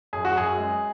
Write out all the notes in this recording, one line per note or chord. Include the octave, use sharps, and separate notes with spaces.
F#2 G#4
F#4
F#2 G#4
G#3